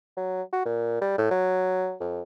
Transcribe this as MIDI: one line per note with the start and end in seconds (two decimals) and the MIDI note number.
0.17 0.42 54
0.53 0.62 66
0.65 0.99 46
1.01 1.15 55
1.18 1.29 45
1.31 1.95 54
2.01 2.21 41